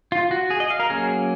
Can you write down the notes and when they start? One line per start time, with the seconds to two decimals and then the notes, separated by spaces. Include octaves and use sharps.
0.12 F4
0.31 F#4
0.50 G#4
0.60 D#5
0.70 F5
0.80 A#4
0.90 F#3 A#3 C#4 G#4